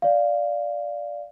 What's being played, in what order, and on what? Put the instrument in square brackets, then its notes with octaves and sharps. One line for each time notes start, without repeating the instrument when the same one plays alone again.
[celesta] D5 F5